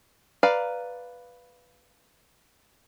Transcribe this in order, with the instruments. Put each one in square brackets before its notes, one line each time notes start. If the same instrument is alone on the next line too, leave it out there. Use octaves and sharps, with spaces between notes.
[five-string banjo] B4 D5 F5 A#5